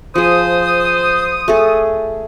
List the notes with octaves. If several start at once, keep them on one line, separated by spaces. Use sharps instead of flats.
F3 G#4 C5 D#6
A3 G#4 A4